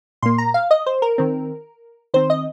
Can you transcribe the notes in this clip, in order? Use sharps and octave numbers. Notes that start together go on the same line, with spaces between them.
A#2 A#3 C6
A#5
F5
D#5
C5
A#4
D#3 C4
D#3 C4 C5
D#5